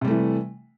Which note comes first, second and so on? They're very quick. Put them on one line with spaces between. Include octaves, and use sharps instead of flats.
C3 G3 A3 E3